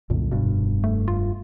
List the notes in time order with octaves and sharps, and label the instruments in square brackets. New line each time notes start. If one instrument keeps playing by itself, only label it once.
[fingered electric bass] C2 F#2 D3 [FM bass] A#2
[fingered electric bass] F1 G2 [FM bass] B2
[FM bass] A3
F4